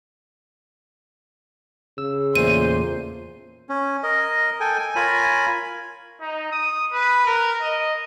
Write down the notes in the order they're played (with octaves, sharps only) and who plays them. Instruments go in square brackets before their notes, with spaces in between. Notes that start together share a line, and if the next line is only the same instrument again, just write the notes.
[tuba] C#3 [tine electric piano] E6
[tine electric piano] E2 A#2 A3 [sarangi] C5 [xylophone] D#7
[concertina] C#4
A#4 D#5
A4 G5 G#5
G#5
F4 A#4 C#5 G#5 B5
[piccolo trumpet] D#4
D#6
B4
A#4
D#5